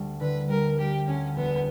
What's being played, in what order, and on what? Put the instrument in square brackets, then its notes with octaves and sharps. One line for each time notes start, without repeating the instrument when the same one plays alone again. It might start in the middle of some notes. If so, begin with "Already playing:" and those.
Already playing: [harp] D2 G3
[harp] D3 [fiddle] B4
[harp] G3 [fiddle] A#4
[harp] G3 [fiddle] G4
[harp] D2 [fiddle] C#4
[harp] E1 [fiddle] B3